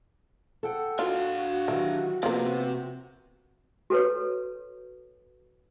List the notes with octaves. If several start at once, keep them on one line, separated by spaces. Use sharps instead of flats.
A4 F#5 G5
D4 F4 F#4 F5
D#3 E3 F#3 G4
C3 F3 A#3 B3
F#4 A4 B4 C#5